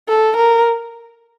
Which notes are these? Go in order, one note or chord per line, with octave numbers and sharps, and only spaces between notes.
A4
A#4